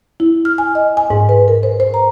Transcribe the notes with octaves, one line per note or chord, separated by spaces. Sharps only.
E4
F6
G#5
D#5
G#5
G#2
B4
A#4
C5
C5
A#5